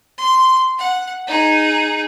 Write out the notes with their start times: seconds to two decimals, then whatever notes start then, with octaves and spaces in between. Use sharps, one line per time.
0.18 C6
0.78 F#5
1.27 D#4 G#4